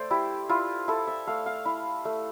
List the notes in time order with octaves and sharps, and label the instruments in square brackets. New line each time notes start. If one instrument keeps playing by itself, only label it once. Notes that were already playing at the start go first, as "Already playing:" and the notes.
Already playing: [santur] A3 C5 D5
E4 G4
E4 F4
E4 A4
E5
A3 F5
F5
E4
A3